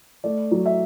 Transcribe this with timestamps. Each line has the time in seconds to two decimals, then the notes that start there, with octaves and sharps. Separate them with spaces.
0.24 A3 D5
0.51 F#3
0.66 E5